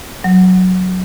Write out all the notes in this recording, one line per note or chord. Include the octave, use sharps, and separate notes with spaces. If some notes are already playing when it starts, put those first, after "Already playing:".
F#3